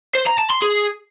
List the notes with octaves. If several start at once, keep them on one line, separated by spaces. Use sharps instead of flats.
C5
A#5
A5
C6
G#4